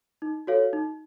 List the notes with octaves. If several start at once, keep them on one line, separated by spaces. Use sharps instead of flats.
D#4
F#4 A4 C#5 F5
D#4